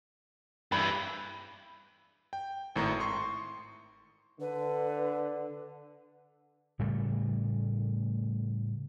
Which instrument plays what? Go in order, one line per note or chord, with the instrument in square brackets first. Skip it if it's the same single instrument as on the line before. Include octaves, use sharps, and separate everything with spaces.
[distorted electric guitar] G2 E3 [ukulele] B5
[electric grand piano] G5
G#1 A2 A#5
C6 C#6
[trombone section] D3 [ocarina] B4
[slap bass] A2 C#3 G3 A3